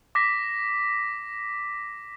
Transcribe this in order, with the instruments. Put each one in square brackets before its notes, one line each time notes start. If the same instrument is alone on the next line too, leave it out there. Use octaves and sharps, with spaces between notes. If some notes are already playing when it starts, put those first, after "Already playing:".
[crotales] D6 A#6 B6